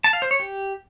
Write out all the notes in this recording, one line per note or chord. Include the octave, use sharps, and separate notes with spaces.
A5
F5
C5
C#5
G4